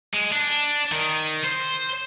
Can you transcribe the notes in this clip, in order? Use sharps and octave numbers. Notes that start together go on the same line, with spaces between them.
G#3
D4
D#3
C5